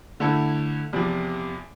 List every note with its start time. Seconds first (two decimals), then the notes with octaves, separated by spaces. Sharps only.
0.20 D3 A3 E4 A4
0.93 E2 C3 F3